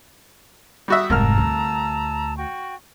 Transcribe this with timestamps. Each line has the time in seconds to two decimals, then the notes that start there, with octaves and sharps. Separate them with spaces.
0.88 G3 F#4 E5 D#6 F#6
1.10 F1 C2 G#2 A#4 A5 A#5 E6 F6
1.38 D2
2.37 F#4 G5 C#6